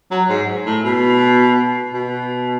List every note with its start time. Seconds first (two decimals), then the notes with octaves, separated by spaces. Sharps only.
0.11 F#3
0.29 G#2
0.66 A2
0.84 B2
1.93 B2